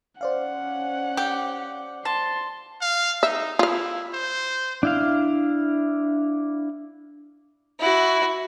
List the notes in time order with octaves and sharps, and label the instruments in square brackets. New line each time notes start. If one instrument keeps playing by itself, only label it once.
[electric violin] C#4 F#5 [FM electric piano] C5 D5 F5
[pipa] G4
[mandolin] A5 [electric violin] C6
[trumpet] F5
[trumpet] D#4 [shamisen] E5
[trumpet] E4 [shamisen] F4 F5
[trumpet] C5
[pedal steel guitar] D4 E4 F5
[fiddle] E4 F#4